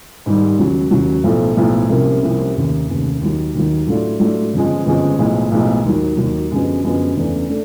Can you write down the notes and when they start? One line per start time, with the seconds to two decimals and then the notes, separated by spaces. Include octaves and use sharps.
0.26 G#2 D#3 G3
0.59 D#2 C#3 F#3
0.91 D#2 C#3 F#3
1.24 B1 A2 F3 A3
1.57 B1 A2 F3 A3
1.89 C2 C3 F3 A#3 C#4
2.23 C2 C3 F3 A#3 C#4
2.56 F1 D#2 C#3
2.89 F1 D#2 C#3
3.21 D#2 D#3 F#3
3.55 D#2 D#3 F#3
3.87 A2 F#3 A3 D4 F4
4.20 A2 F#3 A3 D4 F4
4.54 G1 F2 C#3 F3 G#3
4.86 G1 F2 C#3 F3 G#3
5.18 B1 A2 F3 G#3
5.51 B1 A2 F3 G#3
5.84 D#2 D#3 F#3
6.17 D#2 D#3 F#3
6.51 F#2 D3 F3 G#3 B3
6.84 F#2 D3 F3 G#3 B3
7.16 E2 C#3 E3 A3 D4
7.49 A3 D4